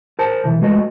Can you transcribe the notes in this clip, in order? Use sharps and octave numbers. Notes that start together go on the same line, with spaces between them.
A#4 C5 A5
B1 E3
G#3 A3 F#4 A4 B4 D#5